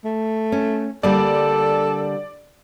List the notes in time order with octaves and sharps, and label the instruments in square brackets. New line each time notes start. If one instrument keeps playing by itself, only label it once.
[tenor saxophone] A3
[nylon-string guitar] C#4
[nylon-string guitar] D3 G3 A#3 [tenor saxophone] A4 [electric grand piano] D5